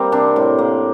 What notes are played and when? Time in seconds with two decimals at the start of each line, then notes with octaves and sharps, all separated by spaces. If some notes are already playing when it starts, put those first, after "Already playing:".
Already playing: G3 A#3 C4 G4 A#4
0.12 C3 D4
0.36 A2
0.58 A#3